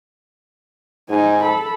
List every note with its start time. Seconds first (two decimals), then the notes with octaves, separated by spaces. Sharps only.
1.09 G#2 D#4 G#5
1.43 A4 B5